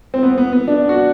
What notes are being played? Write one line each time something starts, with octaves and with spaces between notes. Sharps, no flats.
C4
B3
B3
B3
D4
F#4